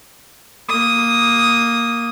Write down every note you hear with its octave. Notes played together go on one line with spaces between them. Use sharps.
A#3 D#6